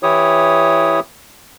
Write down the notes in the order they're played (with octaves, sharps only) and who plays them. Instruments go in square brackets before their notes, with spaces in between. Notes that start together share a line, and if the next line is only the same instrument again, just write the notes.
[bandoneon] E3 E4 G4 C#5 D#6